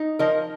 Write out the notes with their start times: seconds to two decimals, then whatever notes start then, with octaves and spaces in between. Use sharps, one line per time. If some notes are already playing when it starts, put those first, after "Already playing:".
Already playing: D#4
0.19 F3 A#4 D#5